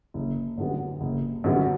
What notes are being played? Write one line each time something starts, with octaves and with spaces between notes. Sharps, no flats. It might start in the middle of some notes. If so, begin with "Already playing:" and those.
F#1
F#2 D3 G3 B3
F#1
F#2 D3 G3 B3